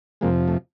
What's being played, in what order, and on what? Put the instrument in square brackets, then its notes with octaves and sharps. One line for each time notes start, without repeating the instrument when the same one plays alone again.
[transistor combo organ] F2 C3 F3 G#3 A#3
A3